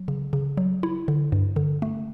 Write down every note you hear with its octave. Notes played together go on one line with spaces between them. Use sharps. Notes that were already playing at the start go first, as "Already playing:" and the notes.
Already playing: F#3
C#3
C#3
F#3
E4
D3
G2
D3
A3